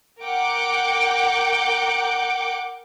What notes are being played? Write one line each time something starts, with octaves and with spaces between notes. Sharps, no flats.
A#4 F#5 G5 D6 G6 D7